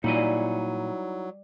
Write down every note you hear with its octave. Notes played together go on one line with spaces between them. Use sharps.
A#2 F#3 G3 D#4 E4 G#5